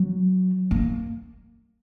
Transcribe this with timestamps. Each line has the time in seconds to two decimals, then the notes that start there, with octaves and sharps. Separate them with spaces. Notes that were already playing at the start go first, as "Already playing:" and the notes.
Already playing: F#3
0.71 A#3